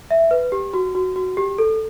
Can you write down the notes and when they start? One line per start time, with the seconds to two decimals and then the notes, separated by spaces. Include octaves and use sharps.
0.11 E5
0.31 B4
0.52 G4
0.74 F#4
0.95 F#4
1.16 F#4
1.37 G4
1.58 A4